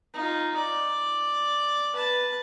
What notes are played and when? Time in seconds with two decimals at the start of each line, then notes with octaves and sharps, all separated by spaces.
0.14 D#4 F4
0.56 D5
1.93 B4 A5